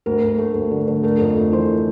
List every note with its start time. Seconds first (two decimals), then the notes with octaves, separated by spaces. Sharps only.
0.06 D2 A#4
0.23 D2
0.38 A3
0.55 D2
0.71 D3
0.88 D3
1.03 A3 A#4
1.21 F2
1.37 A3
1.52 E3 C5